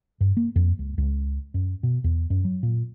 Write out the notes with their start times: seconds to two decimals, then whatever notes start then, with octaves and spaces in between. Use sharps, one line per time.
0.21 G2
0.37 A#3
0.56 F2
0.79 C#2
0.98 C#2
1.54 F#2
1.83 B2
2.04 E2
2.30 F#2
2.45 F#3
2.63 A#2